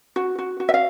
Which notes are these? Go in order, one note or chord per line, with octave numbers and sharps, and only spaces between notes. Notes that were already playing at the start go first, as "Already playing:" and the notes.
F#4
F#4
F#4
E5
F5